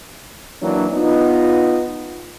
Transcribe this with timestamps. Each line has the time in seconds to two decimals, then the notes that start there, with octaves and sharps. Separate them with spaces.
0.62 E3 F#3 A#3 D4
0.93 B3 D#4 F4